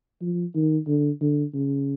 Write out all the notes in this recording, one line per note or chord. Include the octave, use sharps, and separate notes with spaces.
F3
D#3
D3
D3
C#3